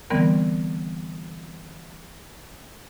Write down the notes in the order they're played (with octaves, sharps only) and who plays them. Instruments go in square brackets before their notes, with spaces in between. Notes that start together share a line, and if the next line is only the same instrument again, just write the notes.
[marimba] D3 E3 G3 B3 C4 A#4